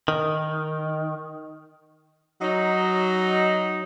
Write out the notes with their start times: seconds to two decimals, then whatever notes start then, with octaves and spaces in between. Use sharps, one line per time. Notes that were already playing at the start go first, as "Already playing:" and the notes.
0.08 D#3
2.42 F#3 D#4